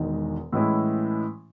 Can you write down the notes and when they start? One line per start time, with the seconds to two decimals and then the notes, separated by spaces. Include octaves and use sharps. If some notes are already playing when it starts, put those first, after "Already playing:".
Already playing: E1 E2 D#3 G#3
0.52 A2 E3 G#3 C#4 E4